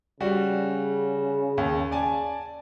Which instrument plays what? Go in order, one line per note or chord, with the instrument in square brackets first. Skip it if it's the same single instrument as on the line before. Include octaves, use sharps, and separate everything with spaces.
[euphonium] C#3 [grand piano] G3 F#4
[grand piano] D#2
D5 G#5 A5